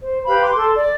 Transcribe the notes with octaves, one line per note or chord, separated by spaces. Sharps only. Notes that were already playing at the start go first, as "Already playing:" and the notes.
C5
G4 B4 F5 B5
C6 D6
A4 C6
D5